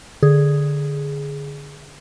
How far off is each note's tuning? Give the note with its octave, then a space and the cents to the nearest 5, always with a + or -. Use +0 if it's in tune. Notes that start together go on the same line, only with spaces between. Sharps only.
D3 +0 G#4 +0